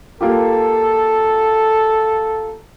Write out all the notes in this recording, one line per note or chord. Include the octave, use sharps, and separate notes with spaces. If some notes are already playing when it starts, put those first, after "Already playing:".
A#3 F4 G4 A4